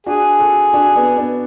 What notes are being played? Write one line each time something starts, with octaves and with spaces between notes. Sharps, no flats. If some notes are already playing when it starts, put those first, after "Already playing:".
D4 F#4 G#4
F#4 A4
D4 F#4
B3 D4
B3 D4